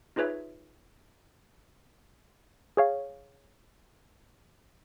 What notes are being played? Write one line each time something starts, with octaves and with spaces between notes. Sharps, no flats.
D#4 F4 G#4 B4 C#5 E5
G#4 C#5 F5